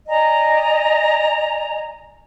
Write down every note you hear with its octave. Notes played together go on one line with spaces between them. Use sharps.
D5 D#5 G#5 A#5